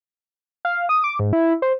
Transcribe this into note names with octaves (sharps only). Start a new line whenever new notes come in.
F5
D#6
D6
G#2
E4
C5